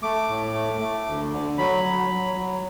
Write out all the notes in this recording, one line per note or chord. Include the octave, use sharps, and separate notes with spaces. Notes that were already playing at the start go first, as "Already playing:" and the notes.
A3 D6
A2
A3
A3
D2
D3
F#3 B5
F#3
F#3
F#3